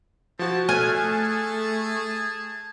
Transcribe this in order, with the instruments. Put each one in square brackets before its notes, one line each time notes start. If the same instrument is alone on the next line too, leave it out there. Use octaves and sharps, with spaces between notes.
[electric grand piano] F3 F#4 [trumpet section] C4 E4 A5
[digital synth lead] A3 [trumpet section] G#4 A5 [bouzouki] G#5 [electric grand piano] F6 F#6